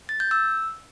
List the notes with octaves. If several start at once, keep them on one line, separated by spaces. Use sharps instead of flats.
A6
G6
E6